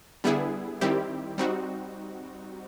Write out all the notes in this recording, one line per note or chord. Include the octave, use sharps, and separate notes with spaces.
D3 G3 B3 E4 G#4
D#3 G3 C4 E4 G4
G3 C4 D#4 F#4